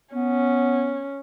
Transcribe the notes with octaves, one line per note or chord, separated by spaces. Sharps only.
B3 C#4